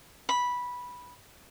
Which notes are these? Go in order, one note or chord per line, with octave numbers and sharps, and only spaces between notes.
B5